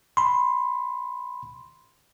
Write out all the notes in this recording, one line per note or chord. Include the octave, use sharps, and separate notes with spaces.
B5 C6